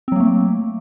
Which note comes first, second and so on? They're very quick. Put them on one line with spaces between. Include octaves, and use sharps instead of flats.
C4 F#3 A#3 A3